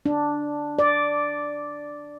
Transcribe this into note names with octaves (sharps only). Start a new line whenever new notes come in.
D4
D5